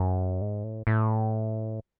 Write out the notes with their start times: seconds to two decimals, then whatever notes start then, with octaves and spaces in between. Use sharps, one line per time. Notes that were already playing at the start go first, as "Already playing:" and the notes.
Already playing: F#2
0.41 G#2
0.64 A2
0.87 A2